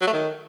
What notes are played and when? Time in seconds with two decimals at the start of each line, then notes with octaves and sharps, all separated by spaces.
0.01 F#3
0.07 A3
0.13 D#3